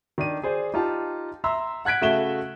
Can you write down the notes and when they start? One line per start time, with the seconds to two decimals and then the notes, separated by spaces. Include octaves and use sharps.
0.18 D#3 D4 D#7
0.43 G#4 C5 D5
0.74 D#4 F4 G4 A5
1.44 E5 A#5 C6 E6
1.85 F#5 F#6 G#6 B6 D7
2.01 C#3 A3 F#4 E5 E7 G7